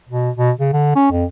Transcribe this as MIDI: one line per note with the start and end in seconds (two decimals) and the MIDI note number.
0.09 0.30 47
0.37 0.51 47
0.59 0.72 49
0.73 0.93 50
0.96 1.09 61
1.11 1.25 41